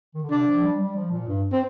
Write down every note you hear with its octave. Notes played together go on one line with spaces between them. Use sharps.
D#3
D3
C3 D4
F3
G3
G3
F3
A#2
G2
C4